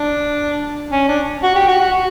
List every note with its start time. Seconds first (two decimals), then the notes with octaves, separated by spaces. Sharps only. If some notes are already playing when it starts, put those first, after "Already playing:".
Already playing: D4
0.92 C#4
1.08 D4
1.43 F#4
1.55 G4
1.68 F#4
1.80 F#4
1.92 F#4